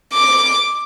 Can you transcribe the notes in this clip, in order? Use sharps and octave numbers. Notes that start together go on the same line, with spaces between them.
D6